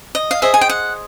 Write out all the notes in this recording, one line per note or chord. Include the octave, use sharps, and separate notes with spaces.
D#5
F5
G#4 C5 D#5 E5
G#5
G5
F#5